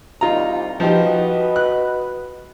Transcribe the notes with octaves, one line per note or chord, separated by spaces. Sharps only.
C2 D#4 F4 A#5
F3 D#4 F#4 G4 B4 D#5
F#6